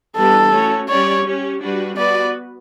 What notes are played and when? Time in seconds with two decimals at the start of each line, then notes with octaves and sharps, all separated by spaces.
0.16 E3 G3 B3 D4 G4 A4
0.52 A3 C#4 F#4 C#5
0.89 G3 C#4 G4 C#5 D5
1.25 C#4 G4 C#5
1.61 G3 D4 F#4 B4
1.97 B3 F#4 B4 D5